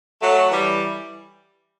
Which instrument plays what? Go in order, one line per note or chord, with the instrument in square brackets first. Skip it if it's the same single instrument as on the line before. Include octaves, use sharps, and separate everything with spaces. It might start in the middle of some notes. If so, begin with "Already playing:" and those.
[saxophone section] F#3 A3
E3 G3